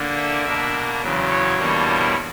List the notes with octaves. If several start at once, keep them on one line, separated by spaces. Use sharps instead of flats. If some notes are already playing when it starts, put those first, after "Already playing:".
Already playing: D3 A#3 D4
E5
B2 A#3 D4 E5
E2 C#3 F#3
C#5
E2 B2 G3 A#3 D4
C#5